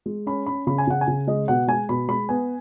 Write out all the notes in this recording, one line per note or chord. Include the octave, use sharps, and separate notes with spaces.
G#3
C#4 B5
C#4 B5
C#3 B5
G#5
C#3 F#5
G#5
C#3
G#3 D#5
B2 F#5
G#3 G#5
B2 B5
G#3 B5
B3 G#5